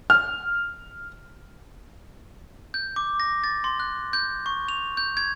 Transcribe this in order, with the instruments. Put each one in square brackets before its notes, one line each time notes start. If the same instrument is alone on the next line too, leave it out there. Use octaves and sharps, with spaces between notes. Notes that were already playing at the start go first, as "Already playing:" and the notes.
[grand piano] F6
[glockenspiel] G6
D6
A#6
A6
C6
F#6
G6
C#6
F7
G6
G#6